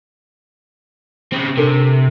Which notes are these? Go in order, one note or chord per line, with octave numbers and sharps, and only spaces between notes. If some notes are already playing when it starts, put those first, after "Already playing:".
C#3 C4
C3 D4 A4 A#4